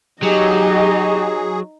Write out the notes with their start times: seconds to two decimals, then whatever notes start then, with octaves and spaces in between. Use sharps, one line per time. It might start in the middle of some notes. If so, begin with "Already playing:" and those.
0.23 F#3 D#4 G4 G#4 D#5